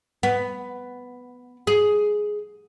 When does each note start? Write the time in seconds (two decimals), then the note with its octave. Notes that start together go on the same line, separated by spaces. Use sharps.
0.23 B3
1.67 G#4